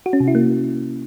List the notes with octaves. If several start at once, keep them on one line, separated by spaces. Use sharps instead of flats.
F#4
C#4
C3
E4
A#3